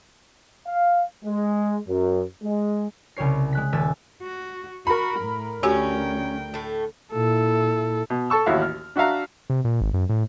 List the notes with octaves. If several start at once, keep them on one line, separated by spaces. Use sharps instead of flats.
F5
G#3
F#2
G#3
C2 C#3 G4 C#5 C7
G#3 F#6 B6
D#1 G#5 E6 A6 B6
F#4
F#4 A#4 B5
A2
D2 C#4 F#4 G4 G5
A2 A3
A#2 E4 A4
B2
A4 A5 C#6 E6
A1 D#2 E4 F#4 E5 F5
F6
D4 F#4 E5 F5 A#5
C3
A#2
G#1
F#2
A2